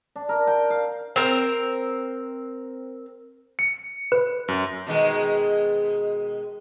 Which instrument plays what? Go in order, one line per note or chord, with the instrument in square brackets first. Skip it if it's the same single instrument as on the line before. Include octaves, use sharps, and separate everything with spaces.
[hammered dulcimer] D4
A#4
G5
F5
[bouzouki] C4 A#4
[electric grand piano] C#7
[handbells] B4
[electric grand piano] F#2
[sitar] B2 D#3 G#3